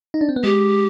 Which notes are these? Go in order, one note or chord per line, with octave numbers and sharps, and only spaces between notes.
D#4
D4
C4
B3
G#3 G4